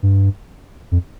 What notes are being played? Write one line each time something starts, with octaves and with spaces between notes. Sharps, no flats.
G2
F2